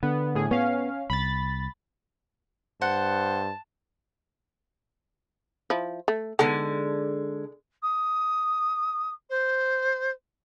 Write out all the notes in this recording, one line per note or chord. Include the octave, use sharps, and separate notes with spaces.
D3 B3
A2 G#4
B3 C#4 F5
C2 B5 A6
G2 C5 F#5 A5
F3 E4
A3
D3 G#3 B3 D#4 A4
D#6
C5